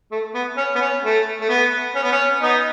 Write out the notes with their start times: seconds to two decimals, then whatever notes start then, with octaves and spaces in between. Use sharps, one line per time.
0.11 A3
0.34 B3
0.57 C#4
0.75 B3
0.81 C#4
1.04 A3
1.41 A3
1.49 B3
1.95 C#4
2.03 B3
2.11 C#4
2.42 B3 D#4